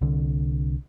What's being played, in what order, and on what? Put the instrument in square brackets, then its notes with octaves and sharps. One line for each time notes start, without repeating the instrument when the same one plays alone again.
[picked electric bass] C2 D3